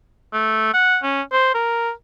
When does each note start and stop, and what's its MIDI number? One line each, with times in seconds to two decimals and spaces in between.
0.33 0.71 57
0.74 0.98 78
1.03 1.22 61
1.32 1.51 72
1.55 1.90 70